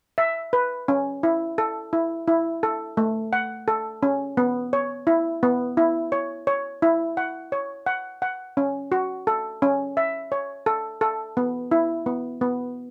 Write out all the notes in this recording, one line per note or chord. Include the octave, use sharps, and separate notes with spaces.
E5
B4
C#4
E4
A4
E4
E4
A4
A3
F#5
A4
C#4
B3
C#5
E4
B3
E4
C#5
C#5
E4
F#5
C#5
F#5
F#5
C#4
F#4
A4
C#4
E5
C#5
A4
A4
B3
E4
B3
B3